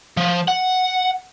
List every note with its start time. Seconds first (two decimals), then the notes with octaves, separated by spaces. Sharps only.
0.17 F3
0.48 F#5